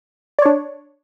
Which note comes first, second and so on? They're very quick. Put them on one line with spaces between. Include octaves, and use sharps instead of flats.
D5 C#5 D4